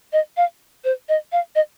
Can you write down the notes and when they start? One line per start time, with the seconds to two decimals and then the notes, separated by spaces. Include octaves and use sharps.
0.13 D#5
0.37 F5
0.84 C5
1.09 D#5
1.32 F5
1.55 D#5